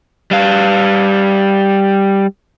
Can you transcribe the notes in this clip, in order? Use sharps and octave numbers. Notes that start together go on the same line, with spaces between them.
G3 F5